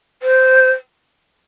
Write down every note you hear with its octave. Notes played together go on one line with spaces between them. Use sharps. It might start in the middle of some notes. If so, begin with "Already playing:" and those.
C5